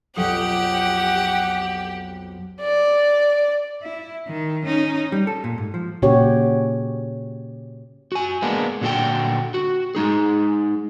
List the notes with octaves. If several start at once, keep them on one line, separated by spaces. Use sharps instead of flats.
B1 F2 F#3 G4 A4 F#5 D#6
D5
E4
D#3
C#4 D#4
G3
A4
A#2
G#2
F3
A#2 C#3 C#4 F#4 G4 C#5
F#4 G#5
G#3 A#3 B3 D4
A#2 D3 E4 F#4 A4 G5
F#4
G#3 D#4 G#4